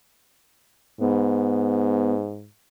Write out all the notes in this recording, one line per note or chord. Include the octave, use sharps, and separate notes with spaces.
G#2 B3